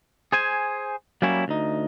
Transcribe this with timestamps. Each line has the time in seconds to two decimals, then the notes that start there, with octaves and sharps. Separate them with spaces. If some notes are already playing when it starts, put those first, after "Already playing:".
0.32 G#4 C5 G#5
1.22 F#3 G3 A#3 C#4 E4
1.48 D2 D#4